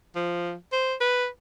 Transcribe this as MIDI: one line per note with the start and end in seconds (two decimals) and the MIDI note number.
0.16 0.54 53
0.72 0.94 72
1.01 1.27 71